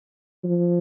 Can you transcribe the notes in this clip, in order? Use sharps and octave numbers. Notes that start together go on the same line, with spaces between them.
F3